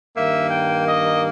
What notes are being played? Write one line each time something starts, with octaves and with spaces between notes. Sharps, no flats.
G2 D#3 A#3 E5
G5
D#5